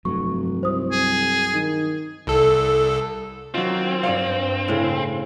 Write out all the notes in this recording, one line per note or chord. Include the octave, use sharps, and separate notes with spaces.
F1 G2 F#3 C#6
C2 C5 D#6
G#4
D#3
C2 A4
D#3 F#3 C4 F4
G2 C#5 D5 F5
A2 C#3